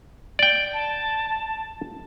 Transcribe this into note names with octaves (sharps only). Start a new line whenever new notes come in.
D5 G5
A5